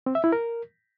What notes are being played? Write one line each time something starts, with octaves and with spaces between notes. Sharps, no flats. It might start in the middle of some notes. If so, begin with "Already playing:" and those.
C4
E5
E4
A#4